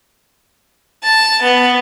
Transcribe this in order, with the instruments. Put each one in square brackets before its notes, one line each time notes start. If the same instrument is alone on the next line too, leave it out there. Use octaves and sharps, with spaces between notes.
[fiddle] A5
B3